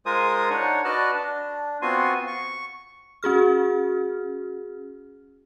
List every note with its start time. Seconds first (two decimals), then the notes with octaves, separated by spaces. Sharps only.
0.06 G#3 F4 A#4 C5 G#5 D#6
0.50 D4 D#4 C#5 F#5
0.85 F#4 B4 D5 D#5 A5 F6
1.13 D4
1.82 B3 C4 F4 F#4 G#5 C6
2.27 C#6
3.23 C#4 F#4 G#4 F6